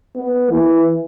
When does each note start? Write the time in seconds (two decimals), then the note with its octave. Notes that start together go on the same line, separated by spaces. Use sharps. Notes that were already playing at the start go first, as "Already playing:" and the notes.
0.16 B3
0.50 E3